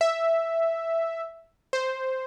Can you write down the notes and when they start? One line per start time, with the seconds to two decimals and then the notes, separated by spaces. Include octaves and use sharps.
0.01 E5
1.73 C5